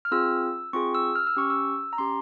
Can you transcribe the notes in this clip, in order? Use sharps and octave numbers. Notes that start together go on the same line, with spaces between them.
F6
C4 F4 G#4 E6
C4 F4 G#4 C#6
E6
F6
E6
C#4 G4 C#6
E6
A#5
C#4 G4 C6